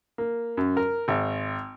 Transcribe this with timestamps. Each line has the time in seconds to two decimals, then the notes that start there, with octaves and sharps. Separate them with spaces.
0.18 A#3
0.57 F#2
0.77 A#4
1.08 G#1